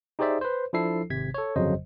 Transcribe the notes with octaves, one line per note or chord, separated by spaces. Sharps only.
D#4 G4 G#4 C5 D5 E5
B4 C5
F3 D4 E4 A4 C7
G#1 C3 G#6 B6
A4 C#5
G1 F2 C#3 F#3 C5 D#5